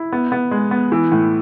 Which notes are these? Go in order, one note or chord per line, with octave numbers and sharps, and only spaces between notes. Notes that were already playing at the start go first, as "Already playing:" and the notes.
Already playing: E4
B3
B3
G#3
B3
E3
A2